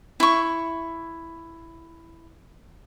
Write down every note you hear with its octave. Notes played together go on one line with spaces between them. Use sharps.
E4 C#6